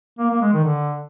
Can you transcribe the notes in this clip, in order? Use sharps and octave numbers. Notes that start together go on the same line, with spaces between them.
A#3
A#3
G#3
D#3
D3